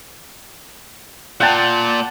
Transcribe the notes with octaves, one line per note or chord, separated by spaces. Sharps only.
A#2 F#5 G5 A5